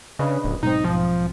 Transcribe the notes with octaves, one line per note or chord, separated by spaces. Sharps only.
C#3 D4 B4 D#5
D1
B1 G#2 C4 D#4
F3